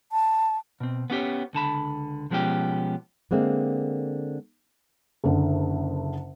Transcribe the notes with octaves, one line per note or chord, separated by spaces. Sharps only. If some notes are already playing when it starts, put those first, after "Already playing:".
A5
B2 C4
B3 C#4 G4 C#5
C#2 D3 A5 B5
B2 F3 G#3 B3 C#4 G4
D3 G#3 A#3 C4
F#1 D3